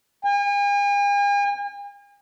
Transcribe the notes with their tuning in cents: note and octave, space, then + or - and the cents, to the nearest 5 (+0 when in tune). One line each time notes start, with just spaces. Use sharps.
G#5 -45